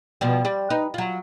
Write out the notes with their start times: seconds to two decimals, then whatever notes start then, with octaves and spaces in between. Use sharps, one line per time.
0.21 B2 F3 G3
0.45 G3
0.70 D#4 B4
0.94 F#3 F4